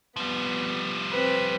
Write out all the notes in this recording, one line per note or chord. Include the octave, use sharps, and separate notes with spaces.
F3 G3 B3
C4 B4